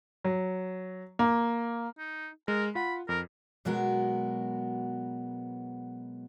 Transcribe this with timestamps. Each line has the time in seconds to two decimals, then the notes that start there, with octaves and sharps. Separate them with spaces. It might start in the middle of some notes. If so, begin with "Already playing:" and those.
0.24 F#3
1.19 A#3
1.98 D#4
2.48 G#3 A#4
2.75 F4 F#5 B5
3.09 F2 A#4
3.65 B2 F#3 G#3 B3 F#4 A#4